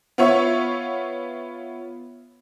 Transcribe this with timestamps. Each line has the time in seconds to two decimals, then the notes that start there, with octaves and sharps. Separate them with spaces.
0.18 B3 F4 C#5 E5